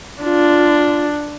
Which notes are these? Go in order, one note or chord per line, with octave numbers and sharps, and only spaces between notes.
D4 F4